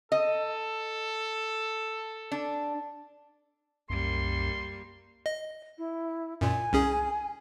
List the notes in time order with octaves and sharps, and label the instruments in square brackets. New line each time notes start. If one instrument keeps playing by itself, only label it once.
[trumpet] A4 [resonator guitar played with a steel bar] D#5
[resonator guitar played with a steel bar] D4
[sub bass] C2 [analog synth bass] F#2 [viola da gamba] G3 A#3 [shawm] C6
[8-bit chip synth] D#5
[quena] E4
[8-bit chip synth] F#2 A#2 [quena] G#5
[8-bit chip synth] C2 C#4 G#4